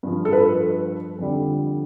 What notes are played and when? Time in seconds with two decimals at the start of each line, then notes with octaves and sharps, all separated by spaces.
0.03 G2 F3
0.25 A4
0.33 B4
1.19 F2 D3 G3